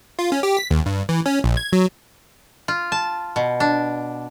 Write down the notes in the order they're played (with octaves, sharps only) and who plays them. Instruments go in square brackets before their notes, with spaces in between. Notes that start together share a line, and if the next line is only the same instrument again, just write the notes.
[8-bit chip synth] F4
C#4
G4
B6
D#2
G2
E3
C#4
A#1
G#6
F#3
[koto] F4
A5
B2
D4